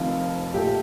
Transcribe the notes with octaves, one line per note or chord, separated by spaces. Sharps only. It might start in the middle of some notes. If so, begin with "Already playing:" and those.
Already playing: F1 F2 D#3 F4
A#1 A#2 A3 G4